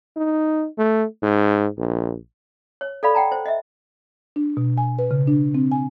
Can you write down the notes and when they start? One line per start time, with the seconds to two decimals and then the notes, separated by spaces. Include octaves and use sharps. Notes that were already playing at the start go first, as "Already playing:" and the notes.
0.16 D#4
0.78 A3
1.22 G#2
1.77 A#1
2.81 C#5
3.03 A4 D5 F5 B5
3.15 F#5 G5 A5 A#5
3.32 C5
3.46 D#5 E5
4.36 D4
4.57 B2
4.78 G#5
4.99 B4
5.11 C#3
5.27 D4
5.55 C4
5.72 G#5